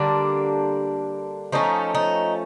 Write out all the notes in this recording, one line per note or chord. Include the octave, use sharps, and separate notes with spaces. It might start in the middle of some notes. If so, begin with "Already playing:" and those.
Already playing: D3 G3 A#3 D4
F3 A3 C#4 D#4
D#4